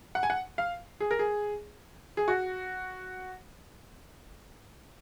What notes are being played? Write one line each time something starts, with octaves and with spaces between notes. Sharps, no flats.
F#5
G#5
F#5
F5
G#4
A#4
G#4
G#4
F#4